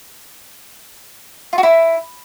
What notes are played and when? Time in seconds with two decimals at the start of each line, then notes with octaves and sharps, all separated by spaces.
1.53 F4
1.58 F#4
1.63 E4